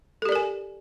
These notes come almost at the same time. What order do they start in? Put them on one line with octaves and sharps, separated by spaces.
A4 G4 D5 A#4 G#5